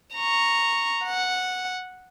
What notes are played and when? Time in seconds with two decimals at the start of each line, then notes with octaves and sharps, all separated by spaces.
0.15 A#5 C#6
1.04 F#5